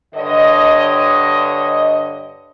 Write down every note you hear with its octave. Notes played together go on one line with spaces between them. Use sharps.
G2 D3 C#5 D#5